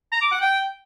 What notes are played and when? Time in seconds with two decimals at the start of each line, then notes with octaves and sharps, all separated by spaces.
0.12 A#5
0.22 D6
0.31 F#5
0.41 G5